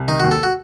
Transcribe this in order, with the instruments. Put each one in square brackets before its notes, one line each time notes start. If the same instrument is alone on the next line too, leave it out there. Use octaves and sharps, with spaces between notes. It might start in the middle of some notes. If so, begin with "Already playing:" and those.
Already playing: [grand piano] C2
[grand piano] D#3 [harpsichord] D#4
[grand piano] D#2 [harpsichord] F#4
[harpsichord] A4
F#4